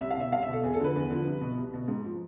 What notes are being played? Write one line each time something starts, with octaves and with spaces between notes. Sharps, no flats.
C2 E5
F5
B2 E5
C2 F5
E5
B2 A4
E2 G#4
A4
D3 F3 B4
E2
D3 F3
C2
B2
C2
B2
G#2
F3